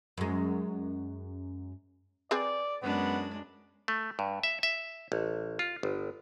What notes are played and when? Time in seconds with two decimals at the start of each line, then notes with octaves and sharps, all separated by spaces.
0.18 F#2 G#3
2.31 C4 G#4 B4 D5
2.82 F#2 G#3 B3 D4
3.88 A3
4.19 G2
4.43 E5
4.63 E5
5.12 A1
5.59 F4
5.83 G1